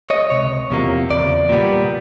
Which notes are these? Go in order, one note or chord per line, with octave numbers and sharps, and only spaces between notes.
C#5 D#5
C#2 C3 C#5
E2 C3 F3 A#3
E2 C#3 D5
A#2 G3 B3